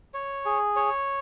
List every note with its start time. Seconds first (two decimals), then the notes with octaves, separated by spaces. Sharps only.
0.14 C#5
0.45 G#4
0.76 C#5